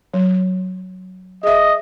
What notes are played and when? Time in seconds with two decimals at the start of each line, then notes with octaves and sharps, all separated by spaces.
0.14 F#3
1.43 G#4 D#5 E5